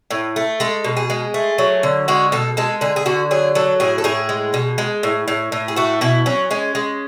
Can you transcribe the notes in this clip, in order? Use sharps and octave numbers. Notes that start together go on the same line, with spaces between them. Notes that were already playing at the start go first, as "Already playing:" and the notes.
A2
A3
G#3 A4
B2
G#4
G#3
A3
F#3
D3
G#3 F#4
B2 A4
G#3 A4
D3 G#4
G#4
D3 F#4
F#3 G#4
F#3 A4
A2 G#4
A4
A2 G#4
G#3
B2
G#3
A2
A2
A2
G#4
A3 F#4
B2 E4
F#3 C#4
G#3 C#4
G#3